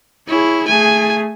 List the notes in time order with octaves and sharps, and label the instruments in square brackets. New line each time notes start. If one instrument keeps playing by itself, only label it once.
[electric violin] E4 [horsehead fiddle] G#4 C#5
[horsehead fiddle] A3 G#4 [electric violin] G#5